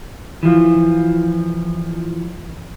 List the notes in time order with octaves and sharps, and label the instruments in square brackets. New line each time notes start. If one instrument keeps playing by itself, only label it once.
[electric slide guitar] E3 F3